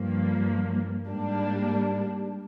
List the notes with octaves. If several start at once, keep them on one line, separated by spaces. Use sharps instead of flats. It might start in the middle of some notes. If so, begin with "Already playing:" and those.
Already playing: G2 F3 A#3
G#2 G3 A#3 D4